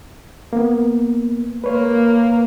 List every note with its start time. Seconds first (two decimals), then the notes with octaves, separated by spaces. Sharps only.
0.53 A#3 B3
1.64 A#3 B4 C#5